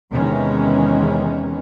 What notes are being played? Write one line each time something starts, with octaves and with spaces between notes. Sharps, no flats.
E2 C3 D#3 E3 G#3 C#4